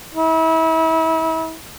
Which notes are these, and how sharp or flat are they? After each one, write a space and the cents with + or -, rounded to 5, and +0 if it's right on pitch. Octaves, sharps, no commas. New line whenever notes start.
E4 -35